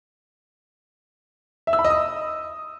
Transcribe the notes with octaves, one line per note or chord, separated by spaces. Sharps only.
E5
E6
B5
D#5
D#6